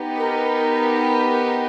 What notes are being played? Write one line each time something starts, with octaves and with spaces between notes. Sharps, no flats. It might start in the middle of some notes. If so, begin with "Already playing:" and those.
Already playing: B3 D#4 G4 B4
A#4